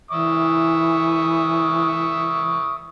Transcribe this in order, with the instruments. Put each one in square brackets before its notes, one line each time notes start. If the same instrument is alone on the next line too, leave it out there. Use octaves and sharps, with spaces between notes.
[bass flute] E3 [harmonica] E5 C#6 D#6